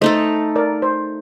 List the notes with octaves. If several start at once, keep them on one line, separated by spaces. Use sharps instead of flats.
A3 D#4 A4 C5 D#5
A#4 D5
C5